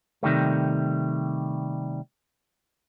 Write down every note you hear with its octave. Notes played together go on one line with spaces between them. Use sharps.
C3 D#3 G3 A3